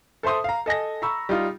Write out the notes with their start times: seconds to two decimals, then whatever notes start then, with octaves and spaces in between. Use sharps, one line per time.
0.23 A4 C5 E5 C6 D#6
0.44 F5 A#5
0.66 A4 D#5 G#5 A#6
1.02 A#5 B5 C#6 E6
1.29 G3 D#4 F4